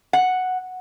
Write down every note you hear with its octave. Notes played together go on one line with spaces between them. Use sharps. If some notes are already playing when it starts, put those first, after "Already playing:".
F#5